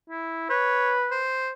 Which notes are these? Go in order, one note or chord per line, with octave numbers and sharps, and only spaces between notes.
E4
B4 C#5
C5